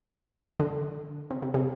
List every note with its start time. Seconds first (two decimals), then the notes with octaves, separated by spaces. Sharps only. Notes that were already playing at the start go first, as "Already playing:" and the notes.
0.59 D3
1.30 C3
1.42 C3
1.54 C3